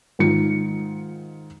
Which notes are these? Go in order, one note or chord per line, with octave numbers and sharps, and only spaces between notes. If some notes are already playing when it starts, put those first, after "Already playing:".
G#2 D#3 F4 C#7